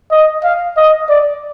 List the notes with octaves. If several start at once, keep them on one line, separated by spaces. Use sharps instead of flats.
D#5
F5
D#5
D5